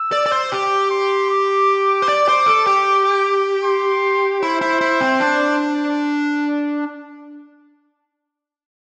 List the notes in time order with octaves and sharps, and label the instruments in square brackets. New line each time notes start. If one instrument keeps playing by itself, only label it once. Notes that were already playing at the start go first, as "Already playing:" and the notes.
Already playing: [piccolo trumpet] E6
[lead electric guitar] D5
D5
C5
[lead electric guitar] G4 [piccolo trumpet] D6
[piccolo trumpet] C6
D6
[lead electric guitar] C5
D5
C5
A4
G4
[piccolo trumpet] C6
[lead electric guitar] E4 [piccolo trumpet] C5
[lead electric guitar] E4
E4
C4
D4